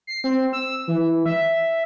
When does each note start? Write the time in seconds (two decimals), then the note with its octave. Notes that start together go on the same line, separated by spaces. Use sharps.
0.07 C7
0.24 C4
0.53 E6
0.88 E3
1.26 E5